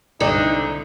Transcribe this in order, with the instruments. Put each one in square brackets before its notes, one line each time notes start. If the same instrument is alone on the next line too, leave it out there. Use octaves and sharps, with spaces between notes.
[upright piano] C2 G#2 [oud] D3 [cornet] D#4